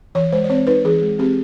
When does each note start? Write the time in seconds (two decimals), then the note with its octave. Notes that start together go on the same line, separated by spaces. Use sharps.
0.15 E3 C#5
0.32 G#3 C5
0.44 D5
0.50 C4 C#5
0.67 D#4 B4
0.85 E3 G#4
1.02 G#3
1.19 C4 G4